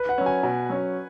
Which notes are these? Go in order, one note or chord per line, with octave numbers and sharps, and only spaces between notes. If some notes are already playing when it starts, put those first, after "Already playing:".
Already playing: B4
F#5
F#3 C#4
G#5
B2
F#3 C#4